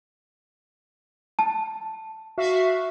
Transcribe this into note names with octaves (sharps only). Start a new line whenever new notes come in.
A5
F#4 E5 F5